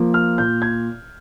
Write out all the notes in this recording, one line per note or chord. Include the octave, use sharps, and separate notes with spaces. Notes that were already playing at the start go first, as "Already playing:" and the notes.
Already playing: F3 A#3
F6
A#2 G6
G#6